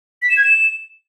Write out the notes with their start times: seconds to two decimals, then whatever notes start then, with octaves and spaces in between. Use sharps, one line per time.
0.22 B6
0.29 E7
0.37 G#6
0.44 E7